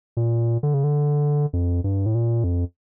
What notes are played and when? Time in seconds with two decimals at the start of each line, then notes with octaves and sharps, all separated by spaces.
0.17 A#2
0.63 D3
0.74 C#3
0.84 D3
1.53 F2
1.84 G2
2.06 A2
2.15 A#2
2.44 F2